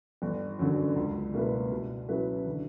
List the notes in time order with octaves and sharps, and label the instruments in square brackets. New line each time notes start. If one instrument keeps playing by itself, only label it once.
[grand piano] G1
F#2 D3 F#3
C#2
B2 A#3 E4 B4
B2
F#3 C#4 E4 B4
D3